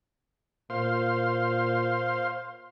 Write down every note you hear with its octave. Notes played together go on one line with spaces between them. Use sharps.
A#2 C5 F5 C6